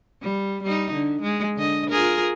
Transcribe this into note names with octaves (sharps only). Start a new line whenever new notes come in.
G3
G3 D#4
D3
G#3
D3 D#5
F4 G#4 A#4